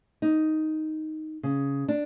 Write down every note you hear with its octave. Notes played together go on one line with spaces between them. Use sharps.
D#4
C#3
D4